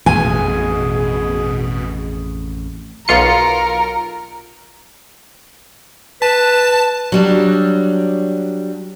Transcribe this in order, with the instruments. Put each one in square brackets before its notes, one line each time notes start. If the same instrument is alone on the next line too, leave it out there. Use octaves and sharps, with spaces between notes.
[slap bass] A1 F2 [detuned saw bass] B2 [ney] G#4 [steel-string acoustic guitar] G#5
[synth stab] B1 F4 C#7 [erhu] A#4
[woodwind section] B4 [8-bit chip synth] A5
[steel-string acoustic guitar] F#3 G3 D4